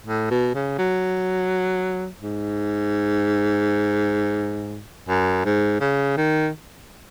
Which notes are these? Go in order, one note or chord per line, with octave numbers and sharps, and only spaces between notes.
A2
B2
C#3
F#3
G#2
F#2
G#2
C#3
D#3